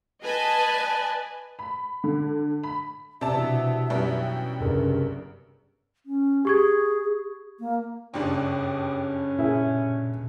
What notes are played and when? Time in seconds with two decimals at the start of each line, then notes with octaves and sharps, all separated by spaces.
0.23 B4 D#5 G#5 A5
1.59 B5
2.04 D3
2.63 B5
3.21 C3 D5 E5 A5
3.34 B2 E3 D4
3.90 F#2 G3 B3
4.20 G5
4.60 F#1 C2 G2 A#4
6.06 C#4
6.45 G4 G#4 C#6 G#6
7.60 A#3
8.14 F#1 G2 C#4 D4 G5 D6 D#6
9.38 A#2 E4 G#4